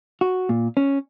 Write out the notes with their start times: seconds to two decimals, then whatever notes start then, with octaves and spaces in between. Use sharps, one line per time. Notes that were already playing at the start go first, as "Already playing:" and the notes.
0.21 F#4
0.49 A#2
0.77 C#4